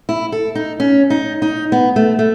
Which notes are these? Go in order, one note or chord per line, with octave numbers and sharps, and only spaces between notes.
E4
A4
D#4
C#4
D#4
D#4
B3
A3
A3